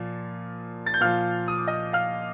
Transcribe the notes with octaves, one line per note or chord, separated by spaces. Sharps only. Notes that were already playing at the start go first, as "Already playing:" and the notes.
Already playing: A#2 F3
A6
G6
A#2 F3 F5 F6
D#6
D6
D#5 D#6
F5 F6